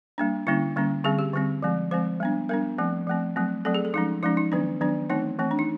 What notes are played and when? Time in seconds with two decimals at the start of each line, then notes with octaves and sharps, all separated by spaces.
0.18 G3 A#3 D4
0.47 D3 G3 A#3 C#4 E4
0.76 D3 G3 A#3 C#4
1.04 D3 G3 C4 G#4
1.19 G4
1.33 D3 G3 C4
1.63 F3 G#3 C4
1.91 F3 G#3 C4 C5
2.20 G3 B3 D4
2.49 G3 B3 D4 A#4
2.78 F3 A3 C4
3.07 F3 A3 C4
3.36 F#3 A3 C4
3.65 F#3 A3 C4 A4
3.75 G#4
3.85 A4
3.94 F3 G#3 C#4 D#4
4.23 F3 G#3 C#4 D#4
4.37 D#4
4.52 D#3 F#3 B3 D4
4.81 D#3 F#3 B3 D4
5.09 E3 A3 C4 D#4
5.39 E3 A3 C4
5.51 D4
5.59 D#4